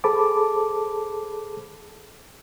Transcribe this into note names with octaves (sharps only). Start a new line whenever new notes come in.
G#4 A4 C5 A5 B5 D6